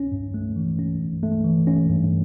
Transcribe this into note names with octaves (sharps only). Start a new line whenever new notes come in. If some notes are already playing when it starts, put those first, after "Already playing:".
Already playing: C#4
G2
A3
E3
C#4
G2
A3
E3
C#4
G2